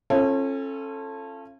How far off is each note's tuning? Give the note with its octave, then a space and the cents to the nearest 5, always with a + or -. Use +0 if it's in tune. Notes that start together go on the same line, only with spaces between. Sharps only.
C#4 -35 F4 -30 A4 +0